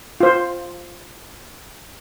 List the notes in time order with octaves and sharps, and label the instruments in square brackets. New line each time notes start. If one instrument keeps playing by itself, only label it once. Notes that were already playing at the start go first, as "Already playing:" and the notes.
[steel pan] F4 C5